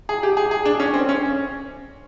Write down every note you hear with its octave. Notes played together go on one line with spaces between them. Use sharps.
G#4
G4
G#4
G#4
D4
C#4
C4
C#4